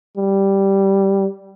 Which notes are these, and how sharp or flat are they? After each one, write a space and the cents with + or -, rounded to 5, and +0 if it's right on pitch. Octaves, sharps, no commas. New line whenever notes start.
G3 -5